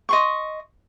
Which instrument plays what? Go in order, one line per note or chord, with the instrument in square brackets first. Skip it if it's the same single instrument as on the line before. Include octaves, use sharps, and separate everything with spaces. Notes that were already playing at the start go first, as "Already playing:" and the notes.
[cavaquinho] D#5 C6 C#6